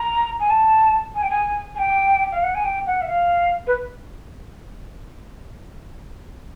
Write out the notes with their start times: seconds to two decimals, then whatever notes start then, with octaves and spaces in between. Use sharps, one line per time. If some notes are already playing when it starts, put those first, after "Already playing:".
Already playing: A#5
0.40 G#5
0.50 A5
1.15 G#5
1.22 G5
1.30 G#5
1.75 G#5
1.78 G5
2.32 F5
2.43 F#5
2.55 G#5
2.64 G5
2.86 F#5
3.01 E5
3.08 F5
3.67 B4